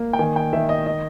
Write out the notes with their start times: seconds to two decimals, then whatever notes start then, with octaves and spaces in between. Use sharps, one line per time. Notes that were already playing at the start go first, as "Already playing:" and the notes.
Already playing: A#3
0.13 G5
0.19 D#3 G#5
0.36 G5
0.53 D#3 E5
0.69 D#5
0.86 D#5